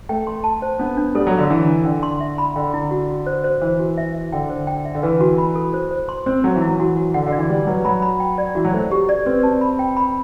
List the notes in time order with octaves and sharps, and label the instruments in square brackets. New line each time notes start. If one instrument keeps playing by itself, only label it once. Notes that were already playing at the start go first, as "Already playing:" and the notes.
[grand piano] A3 [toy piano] G5
[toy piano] C6
A5
C5
[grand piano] B3 [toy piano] D4
[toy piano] D4
[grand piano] G3 [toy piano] A4
[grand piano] F#3
[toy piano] A4
[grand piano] D3
[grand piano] E3 [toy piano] D4
[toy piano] D4
[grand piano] D3 [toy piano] G5
[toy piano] C6
E5
B5
[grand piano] D3 [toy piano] G5
[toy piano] E4
F#4
F#4
C5
C5
[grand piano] E3 [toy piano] C5
[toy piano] F#4
E5
E5
[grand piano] D3 [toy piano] G5
[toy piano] C5
G5
E5
[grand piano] D3
[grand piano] E3 [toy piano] B4
[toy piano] F#4
B5
A4
C5
C5
C6
[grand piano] C4 [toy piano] C5
[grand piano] F#3 [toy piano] A4
[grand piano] E3
[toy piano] E4
[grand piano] F#3
[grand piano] E3 [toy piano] F#4
[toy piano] F#4
[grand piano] D3 [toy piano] F#5
[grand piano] D3
[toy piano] D5
[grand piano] E3
[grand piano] G3 [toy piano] G5
[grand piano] F#3 [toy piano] B4
[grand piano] F#3 [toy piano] B5
[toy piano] B5
G5
D5
[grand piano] E3 [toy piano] F#4
[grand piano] F#3
[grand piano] A3 [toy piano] C5
[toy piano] G4
D5
[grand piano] C4 [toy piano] B4
[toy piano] A5
B5
G5
B5